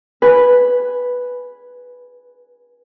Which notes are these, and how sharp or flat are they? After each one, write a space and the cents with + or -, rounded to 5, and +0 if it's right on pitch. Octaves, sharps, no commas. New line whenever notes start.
B4 +0 G#5 +0